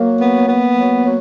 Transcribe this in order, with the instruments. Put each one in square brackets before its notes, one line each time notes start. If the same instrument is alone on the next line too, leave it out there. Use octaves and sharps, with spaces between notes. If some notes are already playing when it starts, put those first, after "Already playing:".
Already playing: [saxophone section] F#3 [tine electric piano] A#3
[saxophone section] B3
B3
F#3
F#3